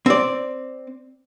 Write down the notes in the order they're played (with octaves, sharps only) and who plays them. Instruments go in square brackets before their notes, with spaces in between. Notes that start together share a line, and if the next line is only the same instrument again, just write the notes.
[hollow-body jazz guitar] C4 D5